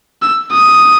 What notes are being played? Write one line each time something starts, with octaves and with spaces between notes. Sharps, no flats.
E6
D#6